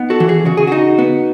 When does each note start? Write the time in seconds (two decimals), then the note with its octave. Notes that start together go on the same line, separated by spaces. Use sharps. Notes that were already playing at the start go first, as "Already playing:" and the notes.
Already playing: B3 D#4
0.10 F#4 A4
0.20 E3
0.29 G#4
0.46 C#3 F#4
0.57 G#4
0.67 D#4 F#4
0.98 B3